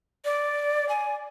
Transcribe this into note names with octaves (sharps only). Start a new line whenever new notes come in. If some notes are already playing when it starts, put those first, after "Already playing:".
D5
G#5